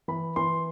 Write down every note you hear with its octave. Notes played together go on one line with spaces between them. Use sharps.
E3 B5
E3 C6